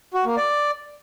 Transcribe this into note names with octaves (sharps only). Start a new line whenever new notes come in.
F#4
A#3
D5